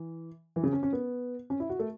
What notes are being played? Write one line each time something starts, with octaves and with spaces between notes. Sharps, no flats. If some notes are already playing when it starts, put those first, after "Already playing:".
Already playing: E3
E3
C#3
C#4
C#4
B3
C#4
E4
F#4
A3